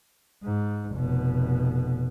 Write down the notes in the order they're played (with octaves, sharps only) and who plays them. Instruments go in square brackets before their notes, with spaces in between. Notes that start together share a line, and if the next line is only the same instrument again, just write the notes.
[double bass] G#2
F1 B2